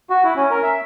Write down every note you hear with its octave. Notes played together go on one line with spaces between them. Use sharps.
F#4
E4
C#4
A#4
E5